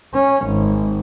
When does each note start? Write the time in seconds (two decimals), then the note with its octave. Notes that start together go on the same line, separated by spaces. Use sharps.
0.14 C#4
0.46 G#1